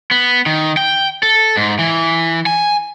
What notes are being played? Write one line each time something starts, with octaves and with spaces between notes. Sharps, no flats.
B3
D#3
G5
A4
G#2
E3
G#5